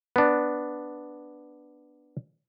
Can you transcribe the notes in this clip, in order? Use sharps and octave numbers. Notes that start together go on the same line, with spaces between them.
B3 D4